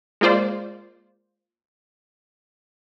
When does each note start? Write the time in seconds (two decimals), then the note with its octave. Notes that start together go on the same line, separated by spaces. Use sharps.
0.21 G#3 A#3 F4 C5 D5